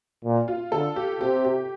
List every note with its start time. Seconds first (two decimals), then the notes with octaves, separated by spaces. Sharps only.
0.24 A#2
0.48 F4
0.72 D3 A4
0.96 G4
1.21 C3 G4
1.45 G4